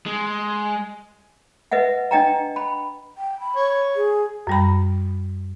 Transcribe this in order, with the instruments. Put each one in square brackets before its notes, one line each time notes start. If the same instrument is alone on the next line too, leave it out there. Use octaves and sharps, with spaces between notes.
[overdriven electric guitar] G#3
[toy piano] B4 D#5 E5 F#5
D4 D#5 G5 A#5
B5
[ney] G5
B5
[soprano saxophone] C#5
[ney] G#4
[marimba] F#2 G3 B5